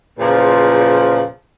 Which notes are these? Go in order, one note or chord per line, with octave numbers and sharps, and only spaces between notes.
E2 A#2 C#3 F3 C5